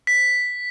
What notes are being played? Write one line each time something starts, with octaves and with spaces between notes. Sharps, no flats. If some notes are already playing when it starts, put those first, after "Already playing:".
B6